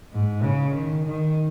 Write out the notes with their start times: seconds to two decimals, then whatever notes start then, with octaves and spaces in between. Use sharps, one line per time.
0.12 G#2
0.43 C#3
0.74 D#3
1.06 D#3